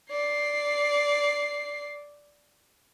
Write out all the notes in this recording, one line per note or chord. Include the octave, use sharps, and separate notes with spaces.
D5 C7